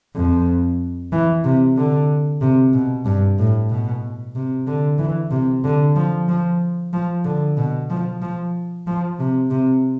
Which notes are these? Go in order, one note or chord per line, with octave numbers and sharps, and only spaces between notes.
F2
E3
C3
D3
C3
B2
G2
A2
B2
C3
D3
E3
C3
D3
F3
F3
F3
D3
B2
F3
F3
F3
C3
C3